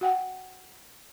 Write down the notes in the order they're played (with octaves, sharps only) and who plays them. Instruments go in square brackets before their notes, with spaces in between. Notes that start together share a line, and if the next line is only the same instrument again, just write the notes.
[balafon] F#4 F#5 G5